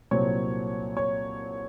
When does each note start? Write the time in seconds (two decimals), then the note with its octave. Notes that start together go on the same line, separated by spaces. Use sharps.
0.11 C2 A#2 F#3 C4 C#5
0.97 C#5